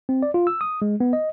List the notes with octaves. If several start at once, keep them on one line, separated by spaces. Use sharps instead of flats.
C4
D5
F4
E6
D#6
G#3
B3
D#5